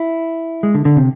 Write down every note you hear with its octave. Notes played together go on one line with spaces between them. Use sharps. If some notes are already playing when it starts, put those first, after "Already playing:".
Already playing: E4
G#3
D3
D3
C3